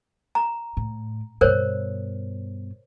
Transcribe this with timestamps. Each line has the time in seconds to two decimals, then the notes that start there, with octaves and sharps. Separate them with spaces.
0.35 A#5
0.77 A2
1.41 G2 B2 A#4 C5 C#5